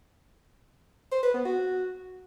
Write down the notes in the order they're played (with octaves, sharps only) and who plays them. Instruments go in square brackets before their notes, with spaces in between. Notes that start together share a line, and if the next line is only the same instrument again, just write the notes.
[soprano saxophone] C5
B4
B3
F#4